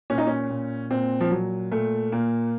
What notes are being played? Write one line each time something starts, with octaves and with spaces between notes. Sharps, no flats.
A#2 C#4
D#4
C#4
A#2
A#2 C4
F3
A#2 F#3
A#2 A3
A#2 A#3